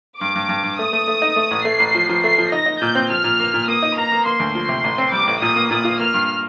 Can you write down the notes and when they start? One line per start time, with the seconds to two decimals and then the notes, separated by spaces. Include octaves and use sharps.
0.20 G2 D6
0.35 G2
0.49 G2
0.63 G2
0.78 A3 D#6
0.93 A3
1.08 A3
1.22 D#4
1.36 A3
1.51 A1
1.65 A3 C7
1.80 A1
1.95 F3
2.09 F3
2.24 A3 C7
2.38 F3
2.52 D#4 A#6
2.66 D#4
2.81 A#2 G6
2.95 C4
3.10 F3 F6
3.24 A#2
3.40 A#3
3.54 A#2
3.68 A#3 D#6
3.82 D#4
3.97 A#3 A#5
4.12 A#3
4.25 A#3 C6
4.40 D2
4.55 F3
4.69 C3
4.84 A1
4.98 C4
5.12 G3 D6
5.27 A1
5.42 A#2 D#6
5.56 A#3
5.71 A#2 D#6
5.84 F4
5.99 A#3 F6
6.14 G2